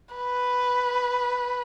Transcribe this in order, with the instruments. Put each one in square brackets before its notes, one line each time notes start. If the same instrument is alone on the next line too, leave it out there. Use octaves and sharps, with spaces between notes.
[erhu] B4